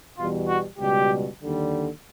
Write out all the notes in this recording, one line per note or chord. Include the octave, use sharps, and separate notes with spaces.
E2 B2 G3 F4
F#4
C#2 B2 G3 G4
D#2 D3 G3